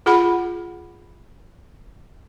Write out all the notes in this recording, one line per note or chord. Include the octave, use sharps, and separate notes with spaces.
F4 G#4 F#5 B5